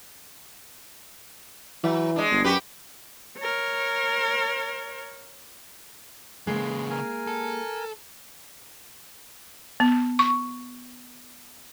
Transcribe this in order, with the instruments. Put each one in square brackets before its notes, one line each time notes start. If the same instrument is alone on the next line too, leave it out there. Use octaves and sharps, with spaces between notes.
[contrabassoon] E3 [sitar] F#3
[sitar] G#3 D4
[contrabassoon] G1
[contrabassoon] F#2 [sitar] F#4 G4 B4
[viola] A#4 C#5
[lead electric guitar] C#3 E3 [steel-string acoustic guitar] G#3 A#3
[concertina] A#4 G#5
[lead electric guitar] A4
[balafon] B3
C#6